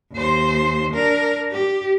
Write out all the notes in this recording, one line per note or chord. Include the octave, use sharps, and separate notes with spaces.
D#2 C5
D4 A#4
G4